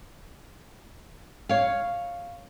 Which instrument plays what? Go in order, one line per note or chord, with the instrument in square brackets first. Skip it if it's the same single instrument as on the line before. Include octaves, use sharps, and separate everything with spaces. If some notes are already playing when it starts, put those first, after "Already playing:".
[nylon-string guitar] C#5 F5